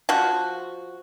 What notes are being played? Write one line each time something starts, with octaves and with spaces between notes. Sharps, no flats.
F3 F#4